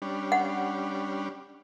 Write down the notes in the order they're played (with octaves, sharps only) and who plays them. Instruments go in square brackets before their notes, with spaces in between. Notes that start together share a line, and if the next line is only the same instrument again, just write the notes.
[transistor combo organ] G3 C#4 D4
[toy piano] F#5